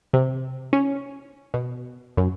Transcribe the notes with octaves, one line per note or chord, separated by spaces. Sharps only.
C3
C#4
B2
F#2